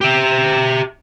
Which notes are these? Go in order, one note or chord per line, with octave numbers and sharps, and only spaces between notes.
G4 E5